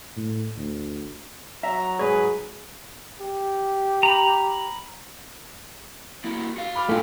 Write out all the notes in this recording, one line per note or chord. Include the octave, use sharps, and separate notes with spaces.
A2
D2
F#3 E5 A#5
G#2 G#4 B4 C#5
G4
A#5 B5
A#3 E4 F#4
F#4 F5
B5 D6 F6
A2 A3 D4 F4 G5 G#5